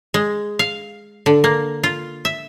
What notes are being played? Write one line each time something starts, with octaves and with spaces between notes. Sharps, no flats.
G#3
F5
D3
A#3
F4
E5